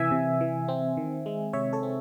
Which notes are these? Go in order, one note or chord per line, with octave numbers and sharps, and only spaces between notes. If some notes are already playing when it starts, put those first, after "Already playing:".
Already playing: C3 E3 E5 G#5
C3
E3
C4
D#3
G#3
C3 C#5 E5
A4 C#5
C4